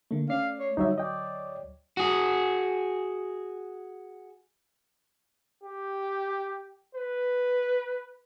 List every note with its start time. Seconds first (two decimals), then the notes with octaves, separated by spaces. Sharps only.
0.11 D3 A3 A#3
0.29 C#4 D5 F5 C7
0.59 C#5
0.77 D2 F#3 G3 D#4 F#4 C#5 E5
0.98 D5 D#5 G5
1.97 F#4 G#4
5.63 G4
6.95 B4